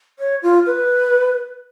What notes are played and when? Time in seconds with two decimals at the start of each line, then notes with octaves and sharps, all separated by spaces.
0.19 C#5
0.42 F4
0.66 B4